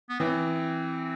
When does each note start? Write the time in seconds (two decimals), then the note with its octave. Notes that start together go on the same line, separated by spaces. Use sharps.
0.09 B3
0.20 E3 C4